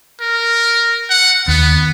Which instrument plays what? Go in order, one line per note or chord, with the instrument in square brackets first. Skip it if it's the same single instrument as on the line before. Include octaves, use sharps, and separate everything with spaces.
[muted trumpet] A#4
F#5
[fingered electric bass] D#2 [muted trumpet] B3